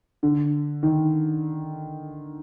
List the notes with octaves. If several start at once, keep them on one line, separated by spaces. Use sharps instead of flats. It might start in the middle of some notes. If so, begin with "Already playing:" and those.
D3
D#3